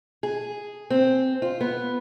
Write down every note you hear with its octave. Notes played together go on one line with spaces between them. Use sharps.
G#4
C4
F4
B3